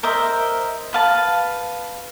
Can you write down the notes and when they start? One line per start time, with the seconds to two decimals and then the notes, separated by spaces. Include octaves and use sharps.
0.03 A#4 C5 D#5 E5
0.93 B4 F5 A5